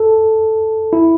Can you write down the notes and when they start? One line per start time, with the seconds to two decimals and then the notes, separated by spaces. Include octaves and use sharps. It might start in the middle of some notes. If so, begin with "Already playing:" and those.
Already playing: A4
0.93 E4